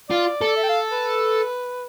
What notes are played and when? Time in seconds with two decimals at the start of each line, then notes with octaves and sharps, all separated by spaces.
0.09 F4 D5
0.41 A4
0.57 E5
0.63 G5
0.69 F5
0.92 B4